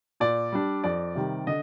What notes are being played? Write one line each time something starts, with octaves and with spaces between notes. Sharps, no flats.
A#2 D5
G3 D4
F2 D5
C3 D#3 G3
D3 D#5